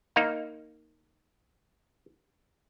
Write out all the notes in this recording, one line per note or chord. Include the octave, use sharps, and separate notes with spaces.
A#3 D#4 F5